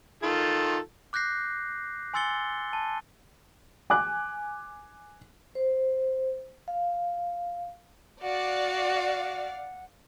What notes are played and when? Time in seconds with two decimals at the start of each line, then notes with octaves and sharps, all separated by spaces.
0.23 D#3 F4 A4
1.13 D6 F#6 G6 A#6 C7
2.14 G#5 C6 E6 A6 C#7 G7
2.73 A5
3.90 G#5 D6 F#6
5.55 C5
6.68 F5
8.22 F#4 D5 F5 F#5